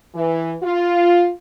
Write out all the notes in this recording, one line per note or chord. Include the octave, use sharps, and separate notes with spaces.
E3
F4